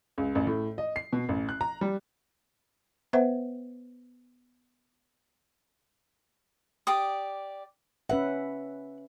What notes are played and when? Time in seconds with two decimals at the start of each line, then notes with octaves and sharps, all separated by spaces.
0.18 C#2
0.35 A1
0.47 A2
0.78 D#5
0.96 C7
1.13 B2
1.29 A1
1.49 F#6
1.61 A#5
1.81 G3
3.13 B3 B4 C5 E5 F#5
6.87 G4 D5 D#6
8.09 C#4 B4 E5 F#5